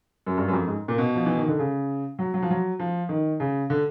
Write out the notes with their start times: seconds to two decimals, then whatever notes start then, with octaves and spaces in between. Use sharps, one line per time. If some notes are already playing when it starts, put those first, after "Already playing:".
0.27 F#2
0.37 G2
0.48 F#2
0.53 F2
0.67 G#2
0.88 A#2
0.98 B2
1.15 F3
1.26 E3
1.37 D#3
1.48 D3
1.59 C#3
2.19 F#3
2.34 F#3
2.42 F3
2.50 F#3
2.79 F3
3.09 D#3
3.40 C#3
3.70 D3